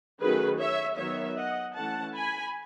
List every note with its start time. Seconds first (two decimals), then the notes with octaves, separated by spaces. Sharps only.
0.20 D#3 F#3 A3 C#4 G#4 B4
0.59 C#5 E5
0.97 D#3 F#3 B3 C#5 E5
1.37 D#5 F#5
1.75 E3 A3 C#4 F#5 A5
2.14 G#5 B5